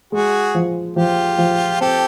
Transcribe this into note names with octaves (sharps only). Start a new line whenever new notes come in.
G#3 F#4 G#4
F3
F3 F4 G4
F3
C4 G4 A4